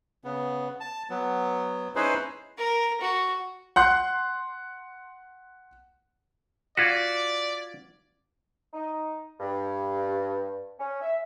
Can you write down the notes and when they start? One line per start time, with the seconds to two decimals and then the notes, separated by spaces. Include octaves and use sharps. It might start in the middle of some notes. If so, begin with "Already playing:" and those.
0.24 C#3 B3
0.80 A5
1.10 F#3 B3
1.96 C#4 D#4 E4 G#4 B4 C5
2.58 A#4
3.01 F#4
3.76 F#5 C6 F#6
6.77 F4 F#4 D5 G#6 B6
8.73 D#4
9.39 G2
10.79 C#4
11.01 E5